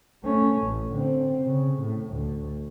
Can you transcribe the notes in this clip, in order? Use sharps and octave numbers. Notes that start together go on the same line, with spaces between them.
A3 C#4
A1
D3 C4
C#3
A2
D2